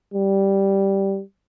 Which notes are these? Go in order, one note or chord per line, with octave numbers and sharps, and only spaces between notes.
G3